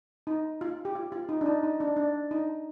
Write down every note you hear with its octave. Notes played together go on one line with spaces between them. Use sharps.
D#4
F4
G4
F4
F4
D#4
D4
D#4
D#4
D4
D4
D#4